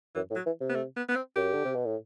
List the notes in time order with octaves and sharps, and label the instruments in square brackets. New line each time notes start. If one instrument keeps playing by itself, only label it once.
[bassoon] F#2 [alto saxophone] E3
[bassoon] A2
[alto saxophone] F#3
[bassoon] E3
C3
[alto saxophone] B3
A3
B3
B3
C4
[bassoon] F#2 [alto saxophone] G4
[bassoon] D3
C3
B2
A2